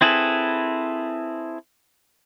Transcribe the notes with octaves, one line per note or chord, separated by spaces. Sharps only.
C4 E4 G#4 A4 B4